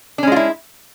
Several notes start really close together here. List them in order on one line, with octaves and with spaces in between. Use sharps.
D4 C#4 G#3 F4 E4